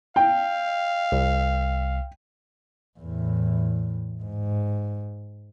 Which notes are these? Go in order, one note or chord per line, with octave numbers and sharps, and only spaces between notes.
F5 G5
C2
E2 A2
G#2